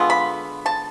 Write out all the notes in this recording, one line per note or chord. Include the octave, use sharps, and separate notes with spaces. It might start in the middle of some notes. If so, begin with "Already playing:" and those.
Already playing: D3 G#3 B3 F4
B5
A5